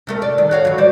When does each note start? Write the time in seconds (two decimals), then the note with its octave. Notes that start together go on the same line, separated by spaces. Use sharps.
0.07 C3 A3 A#4
0.22 D5
0.38 D#3
0.51 F#4 C#5 F5
0.65 E3 F#3
0.78 G3 C5 D5